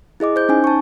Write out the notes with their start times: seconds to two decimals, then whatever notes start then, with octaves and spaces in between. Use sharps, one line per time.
0.20 E4 G#4 D#5 D6
0.36 C5 G6
0.49 C#4 D#4 G#5
0.64 A5 C#6